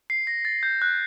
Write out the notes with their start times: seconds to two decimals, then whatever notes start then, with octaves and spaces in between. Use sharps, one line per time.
0.10 C7
0.27 A#6
0.45 A6
0.63 G6
0.82 F#6